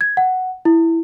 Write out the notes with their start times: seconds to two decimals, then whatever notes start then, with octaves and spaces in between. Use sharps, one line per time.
0.01 G#6
0.17 F#5
0.65 E4